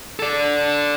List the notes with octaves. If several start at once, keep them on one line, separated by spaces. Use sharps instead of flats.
A4 D5